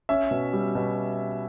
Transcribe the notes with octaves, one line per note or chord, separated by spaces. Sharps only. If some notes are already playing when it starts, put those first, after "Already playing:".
C#4 E5
B2
G3
B2